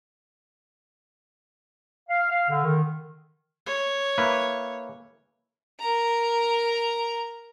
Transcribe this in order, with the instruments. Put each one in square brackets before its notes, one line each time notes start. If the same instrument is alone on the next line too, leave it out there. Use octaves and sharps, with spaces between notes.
[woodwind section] F5
F5
D3
D#3
[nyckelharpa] C#5
[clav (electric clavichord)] A#3 E4 B4
[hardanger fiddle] A#4 A#5